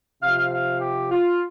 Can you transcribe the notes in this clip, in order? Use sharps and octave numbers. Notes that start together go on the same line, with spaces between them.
C3 F3 F5
F5
G4
F4